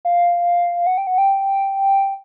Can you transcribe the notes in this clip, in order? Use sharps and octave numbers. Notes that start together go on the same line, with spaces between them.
F5
F#5
G5
F#5
G5